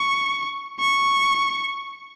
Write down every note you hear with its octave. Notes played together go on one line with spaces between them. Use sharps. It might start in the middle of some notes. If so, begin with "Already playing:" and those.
Already playing: C#6
C#6